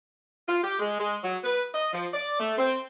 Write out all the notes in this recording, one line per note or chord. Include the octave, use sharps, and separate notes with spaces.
F4
G4
G#3
G#3
F#3
B4
D#5
F3
D5
A3
C4